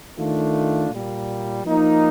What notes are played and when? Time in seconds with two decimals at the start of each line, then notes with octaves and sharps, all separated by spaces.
0.17 D#3 A3 D4 F4
0.90 A#2 G3 A#3
1.63 F3 A#3 D#4